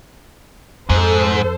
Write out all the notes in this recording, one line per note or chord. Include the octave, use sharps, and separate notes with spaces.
F2 G#2 A4 C5